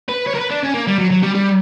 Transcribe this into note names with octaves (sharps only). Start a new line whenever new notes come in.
B4
C#5
A#4
B4
D4
C#4
A#3
G3
F#3
F#3
G3
G3